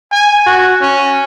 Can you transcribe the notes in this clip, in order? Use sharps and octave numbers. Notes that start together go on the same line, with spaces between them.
G#5
F#4
C#4